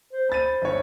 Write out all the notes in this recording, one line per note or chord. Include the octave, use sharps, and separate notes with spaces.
C5
C5 B5 A6 D#7
G1 C#5